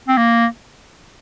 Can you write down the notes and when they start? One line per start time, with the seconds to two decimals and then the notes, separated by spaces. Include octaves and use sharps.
0.08 C4
0.17 A#3